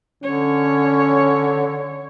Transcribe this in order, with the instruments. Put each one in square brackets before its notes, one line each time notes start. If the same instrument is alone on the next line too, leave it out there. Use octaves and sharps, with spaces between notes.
[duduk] D3 [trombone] C#4 [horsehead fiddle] C#5